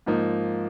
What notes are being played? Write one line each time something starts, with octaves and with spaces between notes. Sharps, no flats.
G#2 F3 A#3 D#4